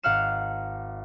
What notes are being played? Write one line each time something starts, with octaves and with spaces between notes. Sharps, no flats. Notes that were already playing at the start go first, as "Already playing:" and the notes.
G#1 F5 F#5 F6 E7